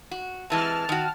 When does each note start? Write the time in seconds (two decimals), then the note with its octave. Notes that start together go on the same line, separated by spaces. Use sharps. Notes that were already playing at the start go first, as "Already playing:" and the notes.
0.11 F#4
0.50 C3 E3 G#3 A5 F6
0.89 D#3 F#4